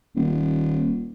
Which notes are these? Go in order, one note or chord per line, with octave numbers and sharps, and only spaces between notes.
D#1